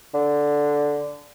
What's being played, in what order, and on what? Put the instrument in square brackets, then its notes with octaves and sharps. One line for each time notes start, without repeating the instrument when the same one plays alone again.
[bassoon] D3